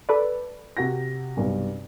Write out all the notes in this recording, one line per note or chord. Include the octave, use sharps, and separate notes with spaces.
A4 B4 D5
C3 F#4 A#6
B1 G2 C3